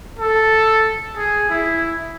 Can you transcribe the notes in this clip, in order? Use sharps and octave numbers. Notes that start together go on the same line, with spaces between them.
A4
G#4
E4